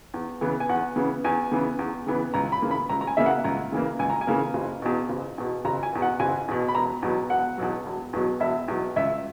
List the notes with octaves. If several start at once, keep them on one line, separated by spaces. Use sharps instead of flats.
E2
C#3 E3 B3
G#5
E2 F#5
C#3 E3 B3
E2 G#5
C#3 E3 B3
E2
C#3 E3 B3
C#2 A#5
B5
C#3 E3 A#3
B5
C#2 A#5
A#5
G#5
C#3 E3 A#3 E5
F#5
C#2 A#5
C#3 E3 A#3
C#2 G#5
A#5
G#5
C#3 E3 A#3
F#1
E2 B2
F#1
E2 B2
F#1 A#5
G#5
E2 B2
F#5
F#1 G#5
E2 B2
B5
E1 A#5
E2 B2 F#3
E1 F#5
E2 B2 F#3
E1
E2 B2 F#3
E1 E5
E2 B2 F#3
C#2 E5